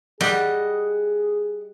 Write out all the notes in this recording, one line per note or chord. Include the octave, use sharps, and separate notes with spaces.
G3 G#4 D#5 F#5